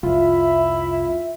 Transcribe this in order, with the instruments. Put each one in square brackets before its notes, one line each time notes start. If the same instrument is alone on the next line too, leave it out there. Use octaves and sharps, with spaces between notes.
[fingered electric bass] C2 F2 [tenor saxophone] E4 [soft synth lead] F4 [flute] E5